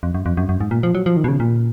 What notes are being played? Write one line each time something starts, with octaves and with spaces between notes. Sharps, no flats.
F2
F#2
F2
F#2
F#2
G#2
A#2
F3
F#3
F3
D#3
B2
C#3
A#2